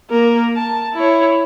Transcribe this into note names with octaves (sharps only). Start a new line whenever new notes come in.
A#3 A#4
A5
E4 C#5